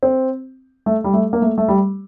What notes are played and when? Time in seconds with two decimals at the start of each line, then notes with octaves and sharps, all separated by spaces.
0.03 C4
0.86 A3
1.04 G3
1.14 A3
1.33 A#3
1.42 A3
1.58 A3
1.68 G3